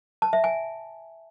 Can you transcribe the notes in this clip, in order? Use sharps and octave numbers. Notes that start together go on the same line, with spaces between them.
A5
E5
G#5